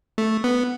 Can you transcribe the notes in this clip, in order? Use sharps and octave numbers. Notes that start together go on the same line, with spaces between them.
A3
B3